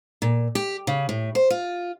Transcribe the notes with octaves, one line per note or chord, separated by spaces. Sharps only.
A#2
G4
C#3
A2
C5
F4